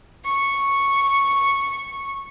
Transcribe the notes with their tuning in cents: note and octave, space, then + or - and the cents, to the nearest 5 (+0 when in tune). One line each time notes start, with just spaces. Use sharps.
C#6 -5